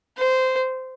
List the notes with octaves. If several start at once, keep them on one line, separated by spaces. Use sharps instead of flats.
C5